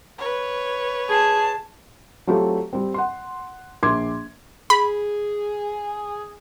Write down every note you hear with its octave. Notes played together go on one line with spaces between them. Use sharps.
B4 C#5
G#4 A5
F#3 A3 C4 F4 G4
G3 C4
F#5 C6
A#1 C6 D6 G#6
G#4 B5